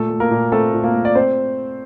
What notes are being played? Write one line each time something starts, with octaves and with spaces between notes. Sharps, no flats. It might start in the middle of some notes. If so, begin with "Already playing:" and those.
Already playing: A#2 A3 A4
A3
A#3 A#4
A#2
A3 C4 A4
A#2
A#3 A#4
A3
D5
C4 C5